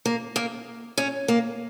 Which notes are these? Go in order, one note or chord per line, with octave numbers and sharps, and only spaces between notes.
A#3
A#3
C#4
A#3